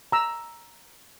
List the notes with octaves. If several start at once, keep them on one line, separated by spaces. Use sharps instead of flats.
A#5 E6